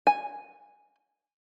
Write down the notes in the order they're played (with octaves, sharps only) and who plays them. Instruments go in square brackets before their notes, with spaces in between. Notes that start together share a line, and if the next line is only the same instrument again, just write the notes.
[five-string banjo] G#5